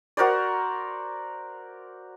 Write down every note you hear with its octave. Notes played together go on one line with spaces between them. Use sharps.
F#4 A#4 C5 D5